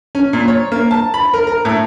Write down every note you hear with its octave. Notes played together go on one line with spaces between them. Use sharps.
C#4
A#2
C#5
A#3
A5
B5
A#4
A#4
A2